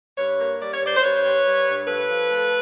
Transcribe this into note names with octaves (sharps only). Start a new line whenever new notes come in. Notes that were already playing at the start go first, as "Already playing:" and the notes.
G2 B4 C#5
A#3
G3 D5
C#5
G2 C5 D5
C5
G2 B4 C#5
G3
G3
G2
F3 A4 B4
F3
A3